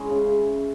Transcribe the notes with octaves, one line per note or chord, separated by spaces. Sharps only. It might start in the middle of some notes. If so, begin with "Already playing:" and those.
Already playing: G#3 C#4 E4 G#4
C#3